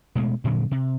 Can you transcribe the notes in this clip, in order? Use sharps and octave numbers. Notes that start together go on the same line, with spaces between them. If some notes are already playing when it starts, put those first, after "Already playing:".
B2 G#3 A3
G2 A#2 D3 F#3
C3